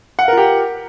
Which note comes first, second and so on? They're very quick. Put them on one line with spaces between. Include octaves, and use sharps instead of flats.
F#5 F5 A#4 F4 G4